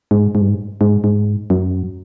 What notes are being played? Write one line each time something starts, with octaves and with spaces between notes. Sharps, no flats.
G#2
G#2
G2
G#2
G#2
G#2
F#2